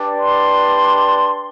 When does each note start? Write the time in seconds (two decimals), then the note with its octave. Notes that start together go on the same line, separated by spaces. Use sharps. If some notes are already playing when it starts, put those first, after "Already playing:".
Already playing: D4 G4 B4 D5
0.20 C6